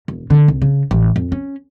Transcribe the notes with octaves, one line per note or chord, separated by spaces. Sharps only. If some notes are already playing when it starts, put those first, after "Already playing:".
E1
D3
C2
C#3
A1
F2
C#4